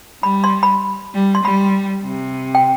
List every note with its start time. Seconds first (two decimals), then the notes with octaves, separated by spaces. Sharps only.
0.23 G3 B5
0.44 C6
0.63 B5
1.14 G3
1.35 C6
1.44 G3 B5
2.05 C3
2.55 G5